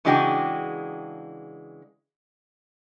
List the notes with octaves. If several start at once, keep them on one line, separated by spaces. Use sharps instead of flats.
C#3 E3 G#3 D4 F#4 G5